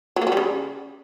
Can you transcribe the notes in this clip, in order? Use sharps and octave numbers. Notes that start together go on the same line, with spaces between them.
F#3
A#3
F#3
G3
C#3